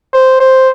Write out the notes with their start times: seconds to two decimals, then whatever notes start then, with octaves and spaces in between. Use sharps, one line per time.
0.13 C5
0.40 C5